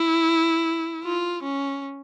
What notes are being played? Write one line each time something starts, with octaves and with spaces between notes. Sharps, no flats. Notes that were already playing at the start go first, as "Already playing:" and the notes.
Already playing: E4
F4
C#4